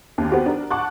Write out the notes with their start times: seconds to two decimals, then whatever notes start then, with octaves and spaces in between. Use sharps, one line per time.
0.18 D#2
0.31 B3 C4 F#4 G4
0.46 D4 A#4
0.71 F#5 A5 C#6 D6 F#6